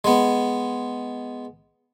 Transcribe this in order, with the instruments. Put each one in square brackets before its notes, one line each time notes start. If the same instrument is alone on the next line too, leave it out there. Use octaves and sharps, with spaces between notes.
[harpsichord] G#3 B3